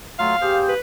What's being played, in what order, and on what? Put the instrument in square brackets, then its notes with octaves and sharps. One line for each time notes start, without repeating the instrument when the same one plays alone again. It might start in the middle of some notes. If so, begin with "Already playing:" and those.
[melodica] F#3 F4 [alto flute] A3 [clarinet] F5
[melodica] A#3 G#4 C5 [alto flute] G4
[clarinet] B4